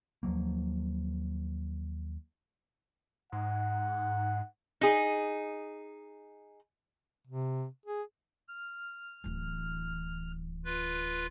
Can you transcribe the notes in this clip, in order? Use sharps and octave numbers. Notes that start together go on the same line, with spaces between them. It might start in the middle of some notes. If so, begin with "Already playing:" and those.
D#2 F3 F#3 A#3
G#2 F#5
D#4 G#4
C3
G#4
F6
D1 E3
F4 B4